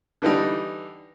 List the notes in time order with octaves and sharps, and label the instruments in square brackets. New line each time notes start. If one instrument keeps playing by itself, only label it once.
[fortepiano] D3 E3 G3 D#4